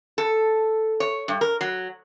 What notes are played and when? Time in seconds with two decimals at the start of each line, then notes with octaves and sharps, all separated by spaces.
0.18 A4
1.00 C#5
1.28 G2
1.41 A#4
1.61 F#3